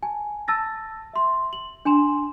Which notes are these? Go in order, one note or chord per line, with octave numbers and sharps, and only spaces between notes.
G#5 A5
A5 E6 A6 A#6
E5 C6
F#7
D4 G#5 C6 E7